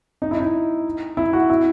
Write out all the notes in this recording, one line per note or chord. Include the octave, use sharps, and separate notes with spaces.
D#4
E4
D#4
E4
F#4
E4